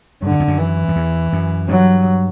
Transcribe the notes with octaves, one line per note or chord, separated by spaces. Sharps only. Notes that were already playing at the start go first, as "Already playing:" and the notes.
G2 D3
F#2
E2
F#2
E3
F#2
E2
F#2
G2 F#3